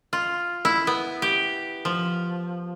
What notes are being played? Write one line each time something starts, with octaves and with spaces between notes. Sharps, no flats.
F4
E4
B3
G4
F3